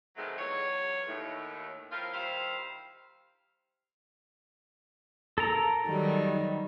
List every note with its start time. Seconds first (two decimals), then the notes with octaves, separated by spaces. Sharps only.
0.17 B2 D#3 F#3 G#3 A3 C4
0.38 E2 F#3 F4 C#5
1.07 D#2 A2
1.91 F3 A#3 C4 E4 F4
2.13 D#3 G3 E4 C5 F5
5.38 A4 A#4 A#5
5.86 D#3 F#3 G3